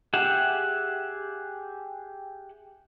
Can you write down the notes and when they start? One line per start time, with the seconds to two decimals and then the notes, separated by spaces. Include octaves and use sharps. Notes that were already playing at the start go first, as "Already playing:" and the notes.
0.14 G4 G#4 E5 F#5